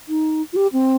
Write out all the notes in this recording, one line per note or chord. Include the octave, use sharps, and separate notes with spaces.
D#4
F4
G4
C4